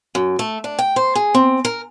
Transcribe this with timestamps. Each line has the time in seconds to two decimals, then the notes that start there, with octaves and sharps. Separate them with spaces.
0.15 F#2
0.39 A3
0.64 D4
0.79 G5
0.96 C5
1.15 G#4
1.34 C4
1.65 A#4